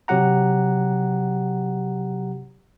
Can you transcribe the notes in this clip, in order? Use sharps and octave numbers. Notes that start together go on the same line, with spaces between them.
C3 F#3 G4 F#5 A#5